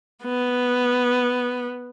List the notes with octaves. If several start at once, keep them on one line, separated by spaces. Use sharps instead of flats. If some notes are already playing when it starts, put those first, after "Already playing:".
B3